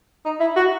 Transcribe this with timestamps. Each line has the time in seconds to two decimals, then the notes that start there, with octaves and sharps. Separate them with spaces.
0.25 D#4
0.40 E4
0.56 F#4